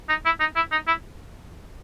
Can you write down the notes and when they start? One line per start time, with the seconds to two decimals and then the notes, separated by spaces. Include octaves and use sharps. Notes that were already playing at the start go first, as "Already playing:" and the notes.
0.09 D#4
0.25 E4
0.40 D#4
0.56 E4
0.72 D#4
0.87 E4